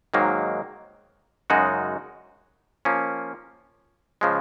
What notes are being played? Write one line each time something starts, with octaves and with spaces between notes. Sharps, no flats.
G#2 D#3 F#3 A#3
F#2 C#3 G#3 D#4 F#4
F3 A#3 C#4
C#3 F3 G#3